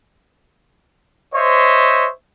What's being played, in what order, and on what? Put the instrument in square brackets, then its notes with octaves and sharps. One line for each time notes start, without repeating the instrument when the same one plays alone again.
[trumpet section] C5 C#5 D#5 E5